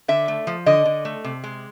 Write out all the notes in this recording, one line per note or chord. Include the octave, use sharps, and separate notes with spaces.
D3 E5
A3
F3
D3 D#5
D3
A3
C3
G#3